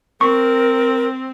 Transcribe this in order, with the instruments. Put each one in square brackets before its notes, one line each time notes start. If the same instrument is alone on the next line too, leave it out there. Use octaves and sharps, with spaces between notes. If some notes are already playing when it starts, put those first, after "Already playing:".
[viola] C4 [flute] A#4 [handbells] C#6